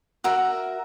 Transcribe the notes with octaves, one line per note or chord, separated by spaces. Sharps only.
F#4 A#4 E5